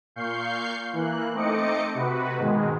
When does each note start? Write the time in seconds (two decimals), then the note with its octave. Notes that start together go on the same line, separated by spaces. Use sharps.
0.16 A#2 F5 C#6 G6 C7
0.93 E3 A#3 F#6
1.33 A3 C4 D#4 D#5 D6 C#7
1.94 C3 F#4 B4
2.37 G#2 B2 D#3 G#3